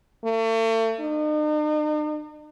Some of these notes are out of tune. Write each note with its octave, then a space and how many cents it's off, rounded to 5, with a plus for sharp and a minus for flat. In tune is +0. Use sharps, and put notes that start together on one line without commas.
A3 +40
D#4 -45